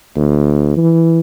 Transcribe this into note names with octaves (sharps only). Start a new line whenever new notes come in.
D2
E3